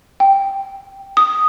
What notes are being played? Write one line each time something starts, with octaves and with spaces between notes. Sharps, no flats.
G5
D#6